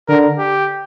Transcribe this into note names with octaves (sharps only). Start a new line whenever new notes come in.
D3 A#4
G4